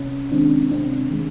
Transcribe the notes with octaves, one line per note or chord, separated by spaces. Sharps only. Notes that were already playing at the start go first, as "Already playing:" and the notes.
Already playing: C3 C#4
D#3 G#3 C4 D4
C3 C4 D4
D#3 G#3